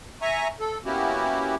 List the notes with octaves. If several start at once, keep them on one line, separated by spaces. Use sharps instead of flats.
E5 G#5 A#5 C#6
A4
A#3 B3 C#4 E4 F#4 G4